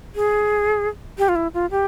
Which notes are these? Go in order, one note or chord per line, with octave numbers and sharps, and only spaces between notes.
G#4
G4
F4
E4
F4
G4